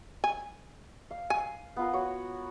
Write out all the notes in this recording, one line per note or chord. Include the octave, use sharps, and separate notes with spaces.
G#5
F5
G#5
B3 F4 A#4
F#4 C#5